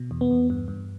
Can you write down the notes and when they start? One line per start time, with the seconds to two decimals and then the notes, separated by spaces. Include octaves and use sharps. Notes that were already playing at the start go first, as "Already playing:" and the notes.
Already playing: B2
0.11 E2
0.21 B3
0.31 E2
0.50 G2
0.68 G2